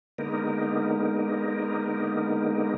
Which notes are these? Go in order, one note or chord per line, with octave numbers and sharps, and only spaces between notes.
D3 G#3 A#3 B3 D#4 A#4